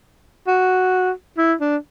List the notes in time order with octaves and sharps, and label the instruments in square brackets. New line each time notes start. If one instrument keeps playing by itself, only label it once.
[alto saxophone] F#4
E4
D4